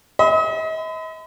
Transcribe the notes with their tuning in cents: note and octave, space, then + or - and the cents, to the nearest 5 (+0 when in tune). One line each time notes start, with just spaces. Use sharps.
D#5 +45 B5 +40